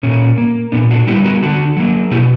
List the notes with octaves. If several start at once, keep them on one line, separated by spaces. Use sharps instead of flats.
A#2 C#4
A#3
A#2 B3 D4
D4 F#4
G3 B3 E4 G4
F#4 A#4
D3 D4 F#4
F#3 A#3
B2 E4 G4